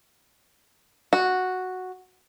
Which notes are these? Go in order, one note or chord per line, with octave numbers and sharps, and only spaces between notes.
F#4